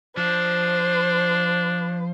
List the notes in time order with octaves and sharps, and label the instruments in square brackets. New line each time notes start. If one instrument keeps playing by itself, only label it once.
[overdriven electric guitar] F3 [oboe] D4 [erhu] C5